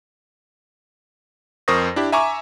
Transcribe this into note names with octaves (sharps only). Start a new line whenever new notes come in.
F2 A#4 C5 C#6 D#6 A#6
D4 E4 G4
E5 G#5 A#5 C#6 D6